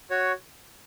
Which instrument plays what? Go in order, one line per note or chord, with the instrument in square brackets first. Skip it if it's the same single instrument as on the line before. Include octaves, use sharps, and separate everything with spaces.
[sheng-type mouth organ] F#4 C#5